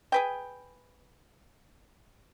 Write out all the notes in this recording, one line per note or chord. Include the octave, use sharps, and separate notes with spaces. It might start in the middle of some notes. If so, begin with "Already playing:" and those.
G#4 B4 G5